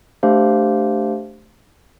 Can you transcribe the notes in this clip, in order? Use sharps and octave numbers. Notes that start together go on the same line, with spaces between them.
A3 D4 G4 C5 F5